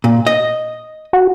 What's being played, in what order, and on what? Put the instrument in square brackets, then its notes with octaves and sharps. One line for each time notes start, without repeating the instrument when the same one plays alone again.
[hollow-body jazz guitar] A#2
D#5
[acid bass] F#4